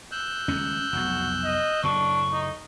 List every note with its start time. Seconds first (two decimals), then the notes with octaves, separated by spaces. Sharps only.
0.12 E6 F#6 G6
0.48 D#1 C#2 C#4
0.93 F1 B1 F#4
1.44 D#5
1.83 F#1 A2 D4 C#6
2.32 D#4